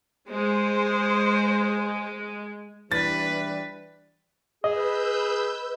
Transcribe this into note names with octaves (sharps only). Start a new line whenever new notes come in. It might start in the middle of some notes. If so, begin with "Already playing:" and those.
G#3 C5
E3 G3 D4 B4 A6
G#4 B4 D#5 E6 G6